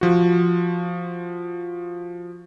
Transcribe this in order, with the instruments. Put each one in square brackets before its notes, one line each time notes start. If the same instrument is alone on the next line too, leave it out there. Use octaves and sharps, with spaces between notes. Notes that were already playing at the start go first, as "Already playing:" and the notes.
[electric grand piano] F3 F#4